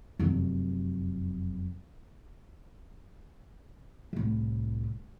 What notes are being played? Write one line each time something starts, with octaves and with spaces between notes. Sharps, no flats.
F1 F#2
C2 A2